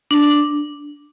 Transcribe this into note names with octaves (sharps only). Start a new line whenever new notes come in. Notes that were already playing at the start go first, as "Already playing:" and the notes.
D4